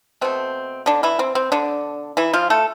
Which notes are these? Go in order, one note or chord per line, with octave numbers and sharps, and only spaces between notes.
B2 A3 C4
D3 D4
E3 E4
C4
C4
D3 D4
E3 E4
F3 F4
A3 A4